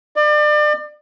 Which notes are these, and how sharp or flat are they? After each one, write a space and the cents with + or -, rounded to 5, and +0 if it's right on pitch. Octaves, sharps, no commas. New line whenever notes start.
D5 +35